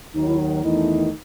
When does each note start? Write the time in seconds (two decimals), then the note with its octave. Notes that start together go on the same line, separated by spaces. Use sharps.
0.14 D#2 D#3 F#3 D#4
0.27 E4
0.38 D#4
0.63 E2 D#3 A3 D#4 E4